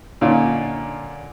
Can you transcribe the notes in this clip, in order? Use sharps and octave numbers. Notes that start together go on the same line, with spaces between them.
A#2 D3 C#4 D#4 F4